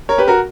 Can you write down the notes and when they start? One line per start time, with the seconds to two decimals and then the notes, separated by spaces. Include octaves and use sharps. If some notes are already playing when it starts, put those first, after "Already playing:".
0.09 A#4 C#5
0.18 G4 B4
0.28 F#4 A#4